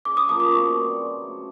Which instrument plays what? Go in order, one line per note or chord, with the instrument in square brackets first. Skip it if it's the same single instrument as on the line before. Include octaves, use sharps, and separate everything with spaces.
[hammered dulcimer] C#3 [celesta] D6
[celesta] D#6
[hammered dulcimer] F3 A#3 [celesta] D#6
[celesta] D6
[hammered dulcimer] B2 [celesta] C#6
[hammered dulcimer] G3 C4
C#3
F#3 A3